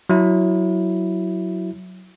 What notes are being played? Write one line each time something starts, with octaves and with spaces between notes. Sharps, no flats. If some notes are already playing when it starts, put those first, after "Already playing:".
F#3 E4